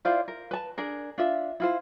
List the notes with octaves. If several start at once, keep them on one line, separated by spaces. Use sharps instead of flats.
E4 F4 C5 D5
A#4
B4 A5
D4 G#4 A#4
D4 F4 E5
E4 F4 C5